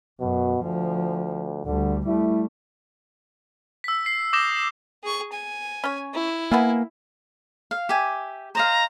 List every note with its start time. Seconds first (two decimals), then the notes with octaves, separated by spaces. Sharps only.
0.20 F#2 B2
0.62 D2 F3
1.66 D2 D3 G3
2.06 G3 A3 E4
3.84 E6 B6
4.06 C7
4.33 D6 D#6 G6 A#6 E7 G7
5.03 G#4 C#6
5.32 G#5
5.84 C#4 C#5
6.14 E4
6.51 A#3 B3 E5 G#5
7.71 F5
7.89 G4 E5 G#5
8.55 C5 D#5 F5 A#5